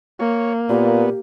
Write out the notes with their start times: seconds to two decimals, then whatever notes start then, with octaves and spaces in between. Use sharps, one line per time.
0.20 A#3 C#5
0.69 A#2 B3 G4